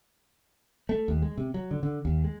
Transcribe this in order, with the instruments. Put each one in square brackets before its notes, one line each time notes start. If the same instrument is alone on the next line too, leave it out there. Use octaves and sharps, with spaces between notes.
[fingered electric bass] A3
D#2
G#3
C3
F#3
D3
D3
D#2
G#3